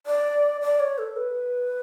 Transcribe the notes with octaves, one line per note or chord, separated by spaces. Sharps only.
D5
D5
C#5
A4
B4